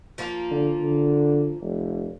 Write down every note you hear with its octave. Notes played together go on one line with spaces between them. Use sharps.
F3 A#3 F4
D3
D3
F1